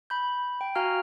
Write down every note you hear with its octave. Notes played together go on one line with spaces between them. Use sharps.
B5 G6
G5
F#4 F5 G#5 A#5 F6